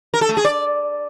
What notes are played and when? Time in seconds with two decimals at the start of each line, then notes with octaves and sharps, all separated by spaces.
0.14 A#4
0.21 A4
0.29 A3
0.37 G#4
0.45 D5